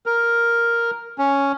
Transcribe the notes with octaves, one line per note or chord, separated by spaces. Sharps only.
A#4
C#4